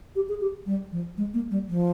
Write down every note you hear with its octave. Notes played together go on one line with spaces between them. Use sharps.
G4
G#4
G4
G3
F3
G#3
A#3
G3
F3